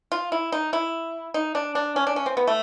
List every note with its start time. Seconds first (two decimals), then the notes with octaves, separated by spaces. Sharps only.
0.12 F4
0.32 E4
0.52 D#4
0.73 E4
1.34 D#4
1.55 D4
1.75 D4
1.96 C#4
2.07 D4
2.16 C#4
2.26 C4
2.37 B3
2.47 A3